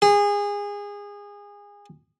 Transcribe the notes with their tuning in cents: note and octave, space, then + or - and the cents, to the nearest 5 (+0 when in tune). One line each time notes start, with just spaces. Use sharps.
G#4 -25